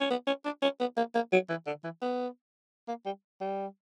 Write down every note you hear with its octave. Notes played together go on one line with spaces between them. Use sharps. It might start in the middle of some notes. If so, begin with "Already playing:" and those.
C#4
B3
C#4
D4
C#4
B3
A#3
A#3
F#3
E3
D3
E3
B3
A#3
G3
G3